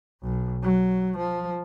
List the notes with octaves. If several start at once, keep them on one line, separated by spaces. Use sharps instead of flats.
B1
F#3
F3